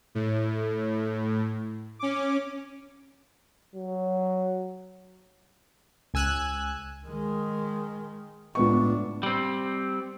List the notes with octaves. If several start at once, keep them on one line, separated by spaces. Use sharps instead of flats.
A2
C#4 D6
F#3
C#2 G#5 E6 F#6 G#6
D#3 G#3
C#2 A2 B3 D4 C#6
G3 C4